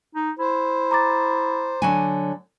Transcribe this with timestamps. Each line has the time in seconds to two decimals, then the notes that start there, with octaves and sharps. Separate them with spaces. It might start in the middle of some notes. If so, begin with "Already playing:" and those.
0.15 D#4
0.39 E4 C5
0.91 A#5 D6 A6
1.82 D3 F#3 G#5